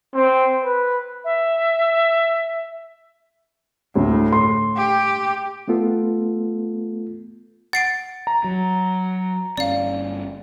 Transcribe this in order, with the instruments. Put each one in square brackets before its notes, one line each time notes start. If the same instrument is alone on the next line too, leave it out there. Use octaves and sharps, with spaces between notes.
[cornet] C4
B4
[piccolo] E5
[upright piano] D2 [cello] A2
[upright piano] C6
[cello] G4
[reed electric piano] A3 B3 F4 A4
[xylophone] F#5 C7 D7 [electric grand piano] A6
[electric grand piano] A#5
[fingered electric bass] F#3
[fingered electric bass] G1 C#4 [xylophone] D5 F5